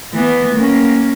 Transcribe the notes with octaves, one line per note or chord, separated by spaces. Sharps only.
E3 B3
A#3 C#4